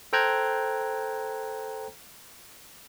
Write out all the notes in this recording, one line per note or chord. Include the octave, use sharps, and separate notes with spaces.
A4 C5 G5 A#5 F#6 G#6